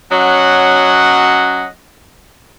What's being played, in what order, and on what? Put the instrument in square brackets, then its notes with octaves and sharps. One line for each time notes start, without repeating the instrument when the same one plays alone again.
[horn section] F#3 C#4 D#5 F#5